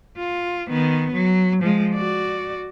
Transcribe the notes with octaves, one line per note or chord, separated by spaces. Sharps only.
F4
D#3 B3
F#3
F3 G#3
F#4 D5